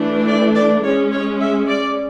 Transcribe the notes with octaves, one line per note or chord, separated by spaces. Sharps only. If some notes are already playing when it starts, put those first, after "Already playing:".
Already playing: E3 A3 D4
D5
D5
G#3 C#4 C#5
C#5
E5
D5